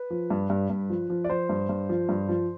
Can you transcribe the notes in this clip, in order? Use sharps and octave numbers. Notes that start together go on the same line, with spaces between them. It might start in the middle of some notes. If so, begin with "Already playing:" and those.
Already playing: B4
F3
G2
G2
G2
F3
F3
D5
F3 C5
G2
G2
F3
G2
F3